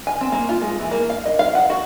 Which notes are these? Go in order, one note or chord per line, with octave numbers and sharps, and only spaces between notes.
G#5
C4
A#3
F4
G#3
E3
A#3
F5
D#5
F5
F#5
F#4